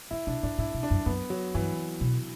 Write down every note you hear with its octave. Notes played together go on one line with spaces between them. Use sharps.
D3 E4
B2 D4
A2 D4
A2 E4
B2
D4
F#2
F#2 B3
F#3
G2 E3
B2